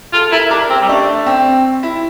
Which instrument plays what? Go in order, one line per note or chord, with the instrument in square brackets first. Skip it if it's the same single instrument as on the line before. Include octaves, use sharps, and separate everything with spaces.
[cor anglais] F4 [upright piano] A4
[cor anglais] E4 [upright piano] A#4
[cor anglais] D4 [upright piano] A#4
[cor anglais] C4 [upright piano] G4
[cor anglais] G3
[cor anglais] A3 [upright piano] D4
[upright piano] C4
E4